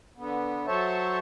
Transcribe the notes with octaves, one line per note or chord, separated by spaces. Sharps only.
D3 B3
F#3 A4 C5 C#5 E5 A5